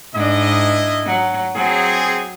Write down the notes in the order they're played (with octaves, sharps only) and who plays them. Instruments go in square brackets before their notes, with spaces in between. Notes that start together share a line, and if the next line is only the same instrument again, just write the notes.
[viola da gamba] G#2 D4 [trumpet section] E4 D#5
[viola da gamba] F#3
[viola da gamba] F#3 [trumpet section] C4 G#4